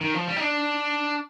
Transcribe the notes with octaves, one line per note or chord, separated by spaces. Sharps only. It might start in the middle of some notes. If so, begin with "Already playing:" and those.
D#3
F3
G3
D#4
D4